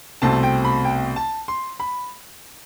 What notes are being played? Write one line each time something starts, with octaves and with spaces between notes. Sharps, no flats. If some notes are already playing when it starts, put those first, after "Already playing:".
C2 B2 A3 C4 A5
G5
B5
G5
A5
C6
B5